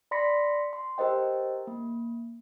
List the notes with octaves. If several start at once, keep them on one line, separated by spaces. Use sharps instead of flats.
D5 B5 C6 A#6 B6 C#7
C6
G4 A#4 C5 D#5 G5
A#3